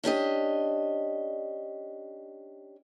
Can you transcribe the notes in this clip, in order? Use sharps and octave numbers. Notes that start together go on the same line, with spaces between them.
C#4 D4 G4 D#5